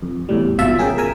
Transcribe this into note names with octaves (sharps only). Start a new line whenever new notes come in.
F2
E2 A2 G3
G#1 B2 F4 E5 A5
C#4 G#4 A#4 G5
A#4 G#5 E6